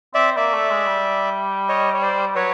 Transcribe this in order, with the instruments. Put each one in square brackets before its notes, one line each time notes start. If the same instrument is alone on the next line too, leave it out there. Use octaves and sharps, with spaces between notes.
[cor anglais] C4 [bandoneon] D5 E5
[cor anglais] A#3 [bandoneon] D5 E5
[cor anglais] A3
G#3
G3
[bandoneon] C#5 D#5
C#5
C5 D5
[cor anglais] F#3 [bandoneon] B4 C#5